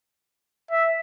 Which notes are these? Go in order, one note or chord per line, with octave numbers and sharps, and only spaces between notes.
E5